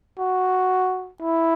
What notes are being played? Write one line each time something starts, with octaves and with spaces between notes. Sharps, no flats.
F#4
E4